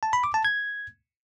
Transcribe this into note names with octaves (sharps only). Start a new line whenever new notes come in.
A5
B5
D6
A5
G#6